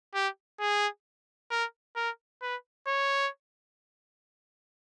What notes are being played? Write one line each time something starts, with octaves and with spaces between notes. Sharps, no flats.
G4
G#4
A#4
A#4
B4
C#5